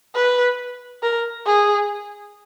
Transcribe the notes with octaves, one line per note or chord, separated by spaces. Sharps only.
B4
A#4
G#4